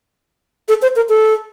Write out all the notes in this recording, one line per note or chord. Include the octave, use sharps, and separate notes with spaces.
A4
C5
A#4
A4